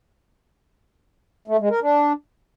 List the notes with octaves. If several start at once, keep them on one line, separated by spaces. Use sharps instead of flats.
A3
G#3
A#4
D4